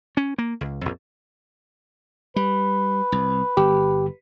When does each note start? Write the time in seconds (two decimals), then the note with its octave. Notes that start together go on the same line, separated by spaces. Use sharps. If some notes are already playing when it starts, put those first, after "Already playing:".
0.17 C#4
0.38 A#3
0.61 C#2
0.81 A#1 F2
2.36 G3 B4
3.12 C2
3.57 G1 G4